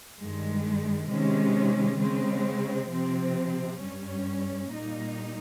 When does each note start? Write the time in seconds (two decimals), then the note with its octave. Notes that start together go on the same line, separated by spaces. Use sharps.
0.19 G2 D#3 G#3
1.09 C3 D#3 G#3 C#4
1.99 C#3 G#3 C4
2.89 C3 F3 C4
3.80 G2 G3 C#4
4.71 A#2 G3 A#3 D#4